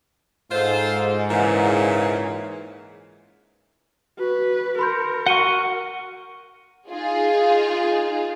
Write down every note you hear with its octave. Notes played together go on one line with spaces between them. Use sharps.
G#2 F4 A4 C5
A#2 C#3 E3
F#4 B4
A#4 B5 C6 G6 C#7
F#4 F#5 C#6 C#7 D#7 G7
D#4 F4 G#4